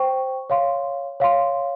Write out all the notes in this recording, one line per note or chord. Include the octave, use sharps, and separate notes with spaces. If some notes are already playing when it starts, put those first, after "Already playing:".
Already playing: C5 G5 C#6
C#5 F5 C6
C#5 F5 C6